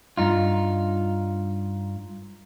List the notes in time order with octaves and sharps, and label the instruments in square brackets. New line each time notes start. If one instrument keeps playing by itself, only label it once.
[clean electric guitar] G2 D#4 F4